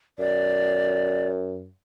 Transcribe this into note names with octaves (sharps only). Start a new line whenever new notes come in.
F#2 D5